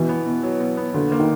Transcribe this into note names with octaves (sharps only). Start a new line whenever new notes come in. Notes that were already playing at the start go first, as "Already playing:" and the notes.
Already playing: B2 E3
B3
B2
F#3
B2
B3
A#2 D3
A#3
D#3